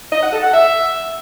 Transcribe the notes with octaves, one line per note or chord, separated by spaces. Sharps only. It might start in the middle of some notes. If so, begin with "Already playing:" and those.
D#5
F#5
A4
F#5
E5